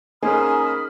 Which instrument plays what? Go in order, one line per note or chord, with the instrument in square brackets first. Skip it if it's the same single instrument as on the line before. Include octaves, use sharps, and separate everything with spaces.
[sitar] G#2 [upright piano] A#3 C#4 D#4 [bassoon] G#4 [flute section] B5 D#6 F6